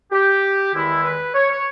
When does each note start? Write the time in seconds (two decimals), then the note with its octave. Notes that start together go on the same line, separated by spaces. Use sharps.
0.12 G4
0.73 E2 D#3 G#3 E4
1.04 B4
1.34 C#5
1.49 C#5